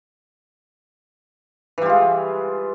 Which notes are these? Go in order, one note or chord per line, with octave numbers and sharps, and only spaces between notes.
E3 G3 G#3 F4